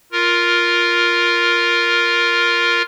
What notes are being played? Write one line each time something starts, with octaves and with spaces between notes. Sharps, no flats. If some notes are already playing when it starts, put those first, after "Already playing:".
F4 A#4